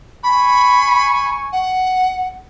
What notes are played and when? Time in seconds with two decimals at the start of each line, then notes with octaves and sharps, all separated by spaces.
0.23 G#5 B5 C#6
1.53 F#5